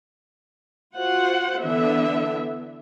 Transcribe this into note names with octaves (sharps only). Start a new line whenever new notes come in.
F4 F#4 C5 F#5
D3 E3 B3 D4 E5